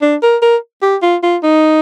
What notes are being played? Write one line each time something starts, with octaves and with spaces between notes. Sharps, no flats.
D4
A#4
A#4
G4
F4
F4
D#4